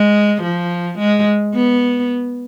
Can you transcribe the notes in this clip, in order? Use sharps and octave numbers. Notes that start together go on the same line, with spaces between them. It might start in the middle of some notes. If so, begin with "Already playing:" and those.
Already playing: G#3
F3
G#3
B3